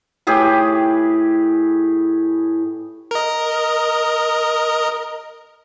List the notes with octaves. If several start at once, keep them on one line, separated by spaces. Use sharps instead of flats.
A2 G4 G#4 B4
A#4 D#5